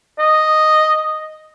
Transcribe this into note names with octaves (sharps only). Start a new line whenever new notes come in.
D#5